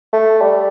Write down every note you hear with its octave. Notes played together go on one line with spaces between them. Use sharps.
A3
G3